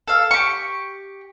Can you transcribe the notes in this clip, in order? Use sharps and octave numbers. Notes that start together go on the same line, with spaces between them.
A4 F5
G4 C#6